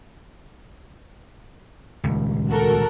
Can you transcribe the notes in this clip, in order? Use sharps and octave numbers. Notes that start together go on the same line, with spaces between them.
D#1 C#2
F#4 A4 A#4